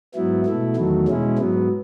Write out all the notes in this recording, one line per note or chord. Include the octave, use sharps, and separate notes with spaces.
G#2 F#3 B3 E4
B2 A3 E4
E2 D#3 F#3 A3
B2 G#3 C#4 E4
G#2 F#3 B3